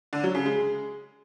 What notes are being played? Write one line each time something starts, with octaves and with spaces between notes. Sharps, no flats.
D3
F#3
C#3
G#3